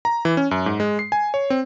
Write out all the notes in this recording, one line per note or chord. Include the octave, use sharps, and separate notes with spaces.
A#5
E3
C#4
F#2
G#2
G#3
C7
G#5
C#5
C4